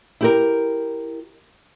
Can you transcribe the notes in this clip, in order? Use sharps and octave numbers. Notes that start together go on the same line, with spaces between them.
E4 G4 A#4